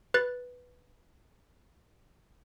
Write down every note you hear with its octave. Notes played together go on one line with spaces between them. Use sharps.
B4 F#6 A6